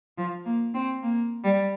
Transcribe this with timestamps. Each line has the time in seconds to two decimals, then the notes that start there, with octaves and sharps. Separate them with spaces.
0.18 F3
0.46 A#3
0.74 C4
1.02 A#3
1.44 G3